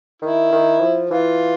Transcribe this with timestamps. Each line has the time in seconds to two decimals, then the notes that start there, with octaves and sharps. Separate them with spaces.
0.22 D#3 E4
0.52 D#3
0.80 F3
1.10 E3 F4